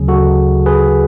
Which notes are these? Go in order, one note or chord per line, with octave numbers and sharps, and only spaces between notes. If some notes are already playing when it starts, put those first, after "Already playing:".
Already playing: D2 C#3 F#3 G#4
F#4 A4
G#4 B4